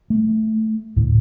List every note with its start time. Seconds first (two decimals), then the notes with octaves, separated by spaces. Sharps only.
0.10 A3
0.96 D2 A2